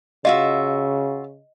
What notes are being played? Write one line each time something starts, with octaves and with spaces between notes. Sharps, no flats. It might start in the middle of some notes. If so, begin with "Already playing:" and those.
C#3 F4 F#4 D#5 E5